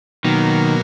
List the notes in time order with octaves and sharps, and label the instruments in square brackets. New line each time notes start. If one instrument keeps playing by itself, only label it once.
[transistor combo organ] B2 F#3 A#3 [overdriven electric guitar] D#3